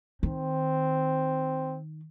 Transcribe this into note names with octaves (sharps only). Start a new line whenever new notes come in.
D#3 C4